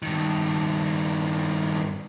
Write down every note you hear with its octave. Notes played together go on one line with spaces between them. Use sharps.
G2 D#3